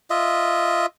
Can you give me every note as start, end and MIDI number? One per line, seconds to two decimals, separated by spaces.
0.10 0.86 65
0.10 0.86 75
0.10 0.86 76